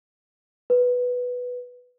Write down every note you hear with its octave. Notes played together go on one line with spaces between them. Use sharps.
B4